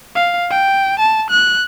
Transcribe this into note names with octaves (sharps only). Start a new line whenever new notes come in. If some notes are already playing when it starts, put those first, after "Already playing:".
F5
G5
A5
F#6